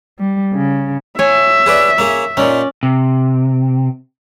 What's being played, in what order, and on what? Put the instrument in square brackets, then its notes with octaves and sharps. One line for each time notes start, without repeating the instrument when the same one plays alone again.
[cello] G3
C#3
[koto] C#5 G#5 [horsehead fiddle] E5
[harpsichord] G#4 B4 D5
A#3 C#4 G#4
[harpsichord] A#2 D#4 [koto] C#4 D5
[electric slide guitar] C3